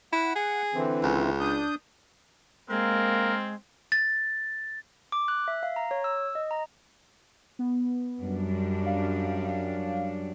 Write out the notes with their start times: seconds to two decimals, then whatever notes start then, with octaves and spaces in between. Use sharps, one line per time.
0.12 E4 F#5
0.35 G#4
0.74 D3 E3 C4
1.03 C#2
1.40 D4 D#6 G6
2.70 G#3 A#3 C4 A#4
3.92 A6
5.12 D6
5.28 F#6
5.48 E5
5.63 F5
5.76 A#5
5.91 C#5
6.04 E6
6.35 D#5
6.51 A#5
7.59 B3
8.21 F#2 G3 D4
8.86 F5